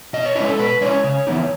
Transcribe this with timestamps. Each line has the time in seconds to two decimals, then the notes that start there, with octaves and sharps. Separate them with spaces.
0.13 B2 D#5
0.25 C#5
0.35 G#3 C#4 E4 C#5
0.47 A4
0.59 B2 B4
0.81 G#3 C#4 E4 C#5
1.04 C#3
1.27 E3 B3 D#4